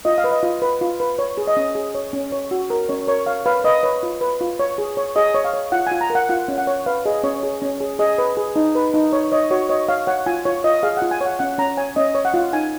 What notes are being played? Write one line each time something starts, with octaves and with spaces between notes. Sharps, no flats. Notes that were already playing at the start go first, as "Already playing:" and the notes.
F4 D#5
F5
B4
D#5
F4
B4
F4
B4
C#5
G#4
D#5
C#4
G#4
C#5
C#4
C#5
F#4
A#4
C#4 C#5
A#4 C#5
C#5 F5
B4 F5
B4 D#5
B4 C#5
F4
B4
F4
C#5
G#4
C#5
G#4 D#5
C#5
F5
C#5
F4 F#5
F4 G#5
A#5
A#4
F#5
F4 F#5
C#4
F#5
C#5
B4 F5
G#4 D#5
C#4 C#5
G#4
C#4
G#4
G#4 D#5
B4
G#4
D#4
B4
D#4
C#5
C#5 D#5
F#4 C#5
C#5 D#5
C#5 F5
C#5 F#5
F4 G#5
F4 C#5
F4 D#5
G#4 F5
F4 F#5
G#5
C#5 F#5
C#4 F#5
C#4 A#5
C#5 G#5
C#4 D#5
C#5
F#5
F4
D#4 G#5